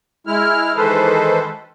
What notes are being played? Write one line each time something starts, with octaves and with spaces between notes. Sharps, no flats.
G#3 E4 F6
D#3 E3 G#3 A4 B4 C5